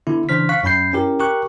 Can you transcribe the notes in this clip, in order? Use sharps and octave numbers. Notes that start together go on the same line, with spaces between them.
D3 B3 E4
C#3 E3 D4 C5 F6 B6
F5 C#6 F#6 B6
F#2 C#4 B5 G6 C7
C#4 E4 G4 A#4
G4 A#4 C#6 F#6